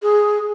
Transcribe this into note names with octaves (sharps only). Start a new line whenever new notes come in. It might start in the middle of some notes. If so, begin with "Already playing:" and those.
G#4